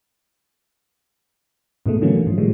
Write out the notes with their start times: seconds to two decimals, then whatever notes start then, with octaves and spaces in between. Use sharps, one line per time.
1.86 G#2 B2 G#3 A3
2.02 D3 E3 F#3 A3 A#3 C#4
2.26 G#2 F3
2.38 A2 D#3 F3 G3 G#3